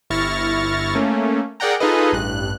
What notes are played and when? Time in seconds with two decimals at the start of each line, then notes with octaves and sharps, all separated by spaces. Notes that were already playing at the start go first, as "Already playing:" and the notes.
0.10 G1 E4 C#6 F6 A6 A#6
0.95 A3 A#3 C#4
1.60 G#4 A#4 D5 F#5 G5 A#5
1.80 D#4 F4 G#4 A4 B4 D#5
2.12 A1 G2 F#6